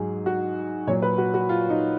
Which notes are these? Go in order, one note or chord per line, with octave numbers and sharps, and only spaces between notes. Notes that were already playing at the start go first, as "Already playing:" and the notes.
Already playing: G#2 F#3 G#4
F#4
A#2 F#3 C#5
B4
F#4
F#4
F4
D#4